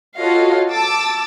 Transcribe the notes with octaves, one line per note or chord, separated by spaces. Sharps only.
F4 F#4 A4 C#5 D#5 F5
A5 D6 E6 A6